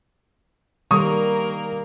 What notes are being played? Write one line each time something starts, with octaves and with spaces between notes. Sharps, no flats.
D#3 G3 A#3 A#4 C#6 D#6